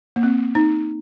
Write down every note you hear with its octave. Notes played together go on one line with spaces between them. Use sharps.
A#3
C4
D#4